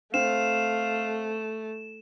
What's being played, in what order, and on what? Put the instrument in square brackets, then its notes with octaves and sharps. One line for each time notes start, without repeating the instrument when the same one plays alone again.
[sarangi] A3 [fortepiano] C4 [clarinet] F5 [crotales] E7